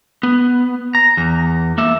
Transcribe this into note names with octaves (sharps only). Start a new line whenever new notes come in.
B3
A#5
E2
A#3 E5